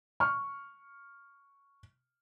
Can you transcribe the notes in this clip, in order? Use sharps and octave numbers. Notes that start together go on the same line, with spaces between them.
C#6 F6